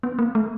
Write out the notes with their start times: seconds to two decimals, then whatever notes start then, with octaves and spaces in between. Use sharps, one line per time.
0.03 B3
0.19 A#3
0.35 A3